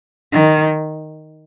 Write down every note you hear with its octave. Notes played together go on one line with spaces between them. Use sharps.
D#3